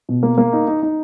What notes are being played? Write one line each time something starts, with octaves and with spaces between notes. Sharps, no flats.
B2
A#3
A#3
D#4
D#4
D#4